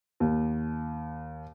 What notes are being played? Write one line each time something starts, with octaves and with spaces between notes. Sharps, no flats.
D#2